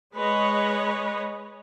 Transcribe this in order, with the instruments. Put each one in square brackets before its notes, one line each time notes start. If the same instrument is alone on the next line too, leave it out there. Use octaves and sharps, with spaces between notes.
[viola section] G#3 B4 C#5 D#5